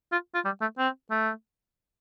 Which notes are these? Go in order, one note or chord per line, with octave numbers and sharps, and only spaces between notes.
F4
F4
G3
A3
C4
A3